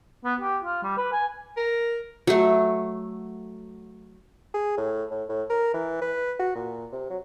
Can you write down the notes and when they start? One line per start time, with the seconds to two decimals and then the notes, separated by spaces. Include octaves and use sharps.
0.24 B3
0.40 G4
0.63 F4
0.83 G3
0.97 B4
1.12 G#5
1.57 A#4
2.27 F#3 A3
4.54 G#4
4.77 A2
5.11 A2
5.29 A2
5.50 A#4
5.74 E3
6.02 B4
6.39 F#4
6.55 A#2
6.92 C3
7.10 F#3